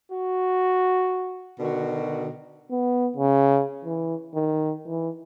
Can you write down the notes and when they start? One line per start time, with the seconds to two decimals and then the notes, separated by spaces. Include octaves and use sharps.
0.12 F#4
1.59 B2 D3 D#3 F#4
2.71 B3
3.17 C#3
3.85 E3
4.35 D#3
4.87 E3